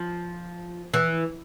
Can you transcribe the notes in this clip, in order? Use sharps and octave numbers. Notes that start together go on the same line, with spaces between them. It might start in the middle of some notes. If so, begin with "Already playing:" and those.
Already playing: F3
E3